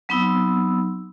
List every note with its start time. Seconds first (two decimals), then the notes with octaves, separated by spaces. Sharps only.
0.09 F#3 B3 C4 D#4 E6